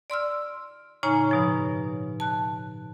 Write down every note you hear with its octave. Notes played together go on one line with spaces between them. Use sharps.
D5 C6 E6 F6
A2 C#3 D#4 C#5 G#5 A#5
G2 B2 F3
A5 F#6